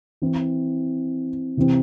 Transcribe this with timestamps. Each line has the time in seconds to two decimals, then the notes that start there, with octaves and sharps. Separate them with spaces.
0.22 E3 C4 E4
1.57 C3 E3 C4